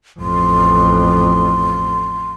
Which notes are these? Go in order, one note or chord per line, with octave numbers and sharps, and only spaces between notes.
A1 F2 C6